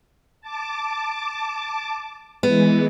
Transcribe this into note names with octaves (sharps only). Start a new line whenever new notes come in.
A5 D6
E3 G#3 B3